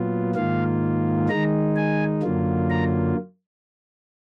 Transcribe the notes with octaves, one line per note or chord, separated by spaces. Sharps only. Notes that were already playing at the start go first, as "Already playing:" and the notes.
Already playing: A#2 F#3 B3 F4
G#2 D#3 A#3 F4 F5
D#3 G#3 D#4 A#5
G#5
F#2 D3 F#3 A#3 F4
A#5